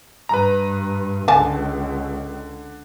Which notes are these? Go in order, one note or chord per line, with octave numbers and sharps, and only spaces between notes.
G2 B4 A#5
C#2 D3 G#5 A5